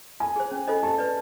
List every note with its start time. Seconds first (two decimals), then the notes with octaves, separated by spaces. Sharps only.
0.20 F4 G#5
0.36 G#4 C5
0.52 C#4
0.68 F4 A4 C5 D#5
0.83 G4 A5
0.98 B4 D5